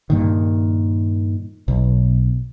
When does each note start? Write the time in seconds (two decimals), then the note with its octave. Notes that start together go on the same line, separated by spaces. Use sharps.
0.10 G2 A#2 D#3
1.68 B1